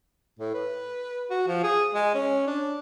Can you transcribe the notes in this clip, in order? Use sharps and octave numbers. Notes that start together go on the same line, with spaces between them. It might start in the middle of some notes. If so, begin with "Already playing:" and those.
A2
B4
F#4
F3
G#4
G#3
C#4
D4